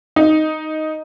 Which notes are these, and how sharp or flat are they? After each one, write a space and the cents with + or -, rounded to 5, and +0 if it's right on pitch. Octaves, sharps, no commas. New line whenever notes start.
D#4 +5